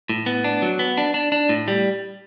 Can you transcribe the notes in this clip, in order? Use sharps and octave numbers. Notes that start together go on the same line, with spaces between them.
A2
B3
D4
F#3
B3
D4
D4
D4
A2
G3